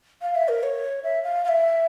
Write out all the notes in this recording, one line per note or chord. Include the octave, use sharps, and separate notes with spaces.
F5
E5
A#4
C#5
E5
F5
F5
E5